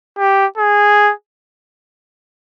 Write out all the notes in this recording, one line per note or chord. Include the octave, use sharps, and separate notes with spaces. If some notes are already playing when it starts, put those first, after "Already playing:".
G4
G#4